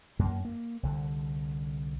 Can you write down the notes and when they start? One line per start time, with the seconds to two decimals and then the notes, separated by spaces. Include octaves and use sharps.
0.19 F#2 A#3
0.45 A#3
0.83 C2 D3